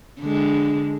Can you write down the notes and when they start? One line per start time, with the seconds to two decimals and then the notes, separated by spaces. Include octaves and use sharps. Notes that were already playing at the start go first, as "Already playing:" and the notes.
0.20 D3 G#3